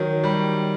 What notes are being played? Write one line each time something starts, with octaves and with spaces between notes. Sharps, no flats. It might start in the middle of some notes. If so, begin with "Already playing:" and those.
Already playing: D#3 F#3
G3